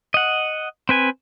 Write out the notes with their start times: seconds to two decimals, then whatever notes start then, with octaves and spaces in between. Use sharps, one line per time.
0.14 D#5 F#5
0.89 C4 B4 G#5